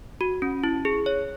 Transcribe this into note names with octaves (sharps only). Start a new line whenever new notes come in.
F#4
C#4
E4
G#4
C#5